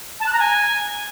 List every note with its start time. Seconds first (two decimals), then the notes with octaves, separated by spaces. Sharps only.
0.20 A5
0.26 F#6
0.33 A#5
0.39 G#5